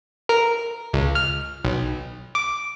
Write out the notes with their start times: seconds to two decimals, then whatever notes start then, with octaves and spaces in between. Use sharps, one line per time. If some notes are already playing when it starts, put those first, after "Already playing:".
0.29 A#4
0.93 C#2
1.15 F6
1.64 B1
2.35 D6